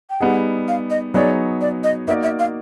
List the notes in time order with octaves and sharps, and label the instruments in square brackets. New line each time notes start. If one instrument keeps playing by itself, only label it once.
[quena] G5
[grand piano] G3 B3 D#4 G#4 [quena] F#5
[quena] F5
D#5
[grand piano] F#3 B3 D#4 G#4 C#5 [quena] D5
[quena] D5
D#5
[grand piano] A#3 D#4 F#4 A#4 D5 [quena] E5
[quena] E5
F5